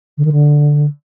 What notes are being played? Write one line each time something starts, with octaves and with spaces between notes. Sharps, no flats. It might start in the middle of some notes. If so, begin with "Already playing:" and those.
D3
D#3
D3